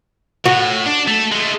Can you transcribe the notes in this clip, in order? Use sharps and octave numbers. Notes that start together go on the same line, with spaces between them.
A2 F#4
D4
A3 A4
G#3 A3